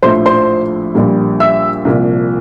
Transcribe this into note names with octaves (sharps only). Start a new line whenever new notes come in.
A#1 A2 F3 A3 C5 C6
C5 C6
A#1 A#2 G3
E5 E6
C2 A#2 F3